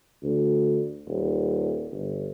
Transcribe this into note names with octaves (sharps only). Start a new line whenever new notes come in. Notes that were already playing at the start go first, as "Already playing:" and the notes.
D2
D#1
G1